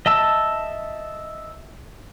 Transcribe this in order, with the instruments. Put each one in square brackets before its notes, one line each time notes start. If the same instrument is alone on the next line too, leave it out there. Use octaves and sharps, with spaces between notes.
[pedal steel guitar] D#5 E5 A5 E6